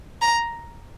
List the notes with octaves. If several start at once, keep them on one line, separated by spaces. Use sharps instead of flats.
A#5